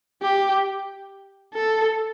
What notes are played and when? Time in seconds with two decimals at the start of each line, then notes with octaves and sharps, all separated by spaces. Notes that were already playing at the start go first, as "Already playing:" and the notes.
0.22 G4
1.54 A4